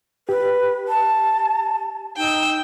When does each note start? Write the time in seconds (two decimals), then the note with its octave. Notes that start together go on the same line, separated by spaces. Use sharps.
0.29 G4 B4
0.88 A5
2.17 D#4 G5 E6